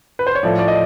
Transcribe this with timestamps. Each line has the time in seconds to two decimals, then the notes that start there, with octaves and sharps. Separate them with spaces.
0.19 B4
0.27 C5
0.35 C#5
0.43 A2 F3 A3 D5
0.59 D5
0.68 D#5